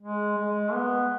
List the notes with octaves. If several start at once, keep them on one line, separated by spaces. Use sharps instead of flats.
G#3
G#3
B3